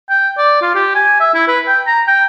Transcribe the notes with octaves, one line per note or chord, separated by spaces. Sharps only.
G5
D5
F4
G4
G#5
E5
E4
B4
G5
A#5
G5